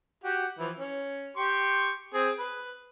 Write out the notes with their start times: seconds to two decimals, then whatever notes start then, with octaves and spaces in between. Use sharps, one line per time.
0.24 F#4 G4
0.59 E3 F3
0.77 C#4
1.37 G4 C6 C#6
2.14 C4 G#4
2.39 B4